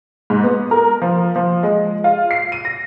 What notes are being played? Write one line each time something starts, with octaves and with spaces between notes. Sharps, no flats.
G#2
B3
A#4
F3
F3
G#3
F4
C7
D#7
A#6